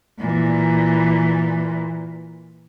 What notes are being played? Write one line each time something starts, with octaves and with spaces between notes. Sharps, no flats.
A#2 E3